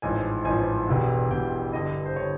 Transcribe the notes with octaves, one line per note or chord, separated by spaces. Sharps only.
A1 G#2 F3 G#5
A1 G#2 F3 G#5
E1 E2 B2 G3 B3
E1 E2 B2 G3 B3 G5
G2 D3 G3 D#5
C5
D3 G3 C#5